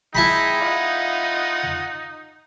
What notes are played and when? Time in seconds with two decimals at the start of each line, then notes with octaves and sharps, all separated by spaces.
0.15 G#3 D#4 E4 G5 A5 B5
0.61 F4 D#5 F#5